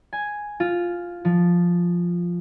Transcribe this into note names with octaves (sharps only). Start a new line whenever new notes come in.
G#5
F4
F3